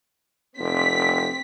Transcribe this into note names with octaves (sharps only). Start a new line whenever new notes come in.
F1 C4 B6